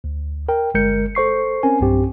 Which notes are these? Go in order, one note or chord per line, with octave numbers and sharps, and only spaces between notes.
D2
A#4 G5
G1 G#3 A#4 G6 C#7
A4 C5 C#6 C7
C4 C#4 A#4 G#5
B1 G2 C4 G4